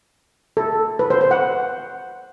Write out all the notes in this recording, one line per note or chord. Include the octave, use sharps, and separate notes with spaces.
A4
B4
C5
C5
F#5